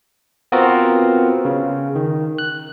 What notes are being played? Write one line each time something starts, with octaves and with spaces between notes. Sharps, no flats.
B3 C4 F4 F#4 A#4
C#3
D#3
F#6